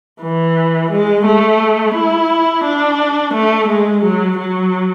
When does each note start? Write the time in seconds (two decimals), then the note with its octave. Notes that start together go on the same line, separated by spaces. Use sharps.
0.22 E3
0.91 G#3
1.26 A3
1.95 E4
2.65 D4
3.34 A3
3.69 G#3
4.04 F#3
4.38 F#3